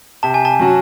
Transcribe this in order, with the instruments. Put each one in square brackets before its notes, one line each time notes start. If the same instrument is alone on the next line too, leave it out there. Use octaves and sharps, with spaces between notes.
[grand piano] C3 [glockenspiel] A5
[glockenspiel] G#5
A5
[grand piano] F#3 C#4 F#4